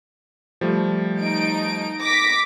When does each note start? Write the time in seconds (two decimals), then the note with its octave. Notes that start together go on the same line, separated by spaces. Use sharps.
0.61 F3 G3 A3
1.21 D#4 D7
2.02 D6 A#6 B6